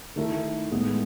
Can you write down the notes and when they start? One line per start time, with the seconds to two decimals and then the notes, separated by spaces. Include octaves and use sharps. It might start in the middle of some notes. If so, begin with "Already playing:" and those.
0.16 D#3 A3 E4 A4
0.72 A2 G#3 B3 E4